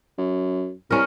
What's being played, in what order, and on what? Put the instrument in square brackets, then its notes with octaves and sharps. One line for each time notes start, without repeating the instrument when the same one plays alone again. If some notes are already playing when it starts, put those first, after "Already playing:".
[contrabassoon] F#2
[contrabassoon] C2 [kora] C#4 A#4